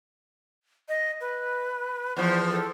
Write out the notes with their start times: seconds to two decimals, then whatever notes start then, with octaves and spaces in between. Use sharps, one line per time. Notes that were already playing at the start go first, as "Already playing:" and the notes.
0.89 D#5
1.21 B4
2.17 E2 F3 C5
2.50 A4